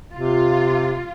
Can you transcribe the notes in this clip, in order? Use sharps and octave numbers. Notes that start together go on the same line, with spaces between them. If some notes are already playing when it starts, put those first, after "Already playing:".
C3 F4